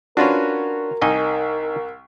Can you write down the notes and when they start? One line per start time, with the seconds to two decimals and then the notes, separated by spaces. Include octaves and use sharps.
0.17 C#4 D4 F4 F#4 A#4 B4
1.02 C2 D#4 D#5 G#5